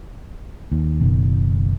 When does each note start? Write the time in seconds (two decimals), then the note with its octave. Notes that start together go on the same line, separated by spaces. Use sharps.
0.72 D#2
1.00 F#1 B2 D#3